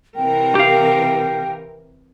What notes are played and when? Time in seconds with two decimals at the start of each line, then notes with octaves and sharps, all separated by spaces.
0.16 C3 E3 A#4 G5
0.55 G4 F5